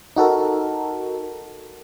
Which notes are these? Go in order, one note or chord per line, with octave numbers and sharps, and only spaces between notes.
D#4 F#4 A4 A#4